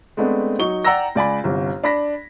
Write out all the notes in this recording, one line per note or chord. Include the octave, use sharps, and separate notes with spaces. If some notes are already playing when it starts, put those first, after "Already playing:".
G#3 A3 B3 C4 D4
F#3 D#4 C#6 G7
D5 F#5 G5 A#5 E6 A#6
C#2 D5 G#5 B5
G1 C2
D4 B5 A#6 B6